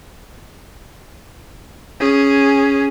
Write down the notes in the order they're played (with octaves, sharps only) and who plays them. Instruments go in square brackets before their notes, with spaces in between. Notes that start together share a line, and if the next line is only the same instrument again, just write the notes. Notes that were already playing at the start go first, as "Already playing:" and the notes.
[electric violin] C#4 G#4